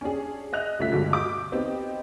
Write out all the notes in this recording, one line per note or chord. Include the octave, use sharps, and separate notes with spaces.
C#4 D4 G#4
D#5 E5 F#6 F7
C2 C#3 A3 F4 E5 B6
G2 B2 D3 G#3 B6
D6 G6
B3 C4 D#4 G4